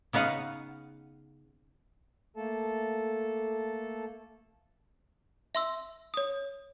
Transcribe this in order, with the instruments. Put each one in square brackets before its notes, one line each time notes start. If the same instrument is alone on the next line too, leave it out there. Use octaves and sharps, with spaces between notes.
[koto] C#3 B3 D#4 F5 F#5
[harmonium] A3 A#3 A4 A5
[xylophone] E5 C6 E6
C#5 D#6